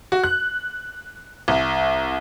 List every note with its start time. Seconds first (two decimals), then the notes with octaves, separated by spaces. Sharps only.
0.12 F#4
0.24 F#6
1.48 C2